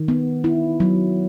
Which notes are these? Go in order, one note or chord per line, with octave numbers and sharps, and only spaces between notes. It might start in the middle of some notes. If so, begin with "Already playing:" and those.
Already playing: D#3
B3
E4
F#3